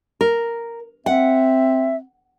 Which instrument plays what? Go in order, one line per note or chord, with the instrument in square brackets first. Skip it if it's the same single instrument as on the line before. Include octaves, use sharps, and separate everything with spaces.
[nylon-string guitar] A#4
[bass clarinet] C4 [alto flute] E5 [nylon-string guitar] F#5